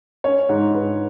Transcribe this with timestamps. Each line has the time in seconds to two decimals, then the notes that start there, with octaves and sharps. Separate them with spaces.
0.24 C#4 C#5
0.49 G#2
0.74 G#2 B4